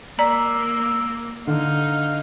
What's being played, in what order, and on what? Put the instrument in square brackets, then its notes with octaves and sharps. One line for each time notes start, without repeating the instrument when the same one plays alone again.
[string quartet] A#3 [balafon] D5 A#5 [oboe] E6
[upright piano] D3 [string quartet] D#4 [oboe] F5